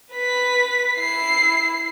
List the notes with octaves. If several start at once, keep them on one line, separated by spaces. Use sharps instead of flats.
B4 B6
E4 C7